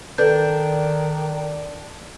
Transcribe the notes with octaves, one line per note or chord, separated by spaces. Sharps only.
D#3 D4 A4 B4 G6